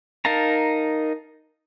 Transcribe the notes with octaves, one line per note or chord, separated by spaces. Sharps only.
D#4 A#4 F5 A5 A#5